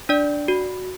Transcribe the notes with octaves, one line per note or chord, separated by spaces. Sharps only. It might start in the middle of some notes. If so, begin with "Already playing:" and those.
D4 D5
F#4